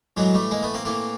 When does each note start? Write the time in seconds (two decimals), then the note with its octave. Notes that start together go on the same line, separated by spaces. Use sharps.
0.17 A2 E3 F#3 G#3
0.34 G3 A3
0.51 G#3 A#3
0.63 A3 B3
0.74 A#3 C4
0.85 A2 E3 A#3 C4